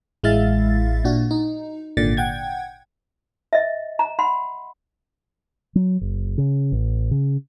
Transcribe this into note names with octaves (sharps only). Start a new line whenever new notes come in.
A1 G#3 E4 E5 F5 A6
A#2 D4 F#4
D#4
G#1 A#2 D3 D5 A6
F#5 G5 G#6
D#5 E5
A#5
F#5 B5 C6
F#3
F#1
C#3
A1
C#3